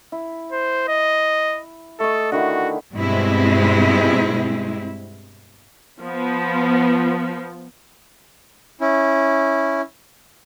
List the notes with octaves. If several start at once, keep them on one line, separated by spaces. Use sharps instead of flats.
E4
C5
D#5
A3 A4 D#5
D3 D#3 E4 F#4
G2 B2 G#3 C4 E4
F3 B3
C#4 E4